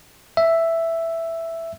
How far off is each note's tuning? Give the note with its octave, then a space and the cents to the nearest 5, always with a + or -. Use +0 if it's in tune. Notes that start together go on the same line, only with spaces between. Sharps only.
E5 +5